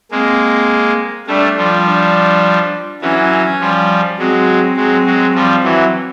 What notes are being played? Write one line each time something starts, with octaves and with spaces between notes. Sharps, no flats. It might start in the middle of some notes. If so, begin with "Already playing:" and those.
G#3 A#3 C4
G3 A3 D4
F3 G3
D4
E3 F#3 C#4
F3 G3
F#3 G#3 C4
F#3 G#3
F#3 G#3
F3 G3
E3 F#3